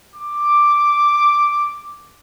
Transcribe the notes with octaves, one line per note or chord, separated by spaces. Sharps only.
D6